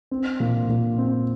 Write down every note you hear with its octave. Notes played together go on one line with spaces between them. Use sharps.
C4
A#2
A#2
C4